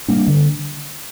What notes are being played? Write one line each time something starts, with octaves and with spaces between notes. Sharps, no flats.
G3 A#3 D4
D3